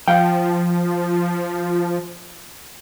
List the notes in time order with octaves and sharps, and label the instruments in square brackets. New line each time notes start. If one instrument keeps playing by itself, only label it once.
[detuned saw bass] F3 [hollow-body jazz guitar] F5 G5